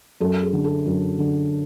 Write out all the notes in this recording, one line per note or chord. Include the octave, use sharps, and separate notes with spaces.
F#2 A4
G#4
D3
A4
F#2
D3